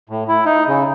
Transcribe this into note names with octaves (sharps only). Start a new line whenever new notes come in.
A2
E4
D#4
C#3